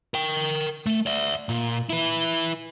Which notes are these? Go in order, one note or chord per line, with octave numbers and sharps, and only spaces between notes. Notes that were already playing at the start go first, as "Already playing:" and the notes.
A#4 G5
A3
D5 E5
A#2
E4 B4